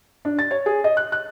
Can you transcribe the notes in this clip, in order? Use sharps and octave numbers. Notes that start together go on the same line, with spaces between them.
D4
A6
C#5
G#4
D#5
F#6
F#6